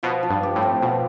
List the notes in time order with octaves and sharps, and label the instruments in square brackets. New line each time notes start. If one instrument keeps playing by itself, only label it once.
[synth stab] B2 [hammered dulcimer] F3
[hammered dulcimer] F3
[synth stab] G2
[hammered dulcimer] G4
[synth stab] A2
[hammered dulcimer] C4
[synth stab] B2 [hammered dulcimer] F3